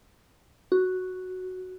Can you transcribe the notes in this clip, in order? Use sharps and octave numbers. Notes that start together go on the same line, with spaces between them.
F#4